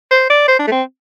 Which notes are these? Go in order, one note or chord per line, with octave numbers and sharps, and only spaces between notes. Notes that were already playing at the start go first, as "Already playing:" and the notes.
C5
D5
C5
D4
A3
C4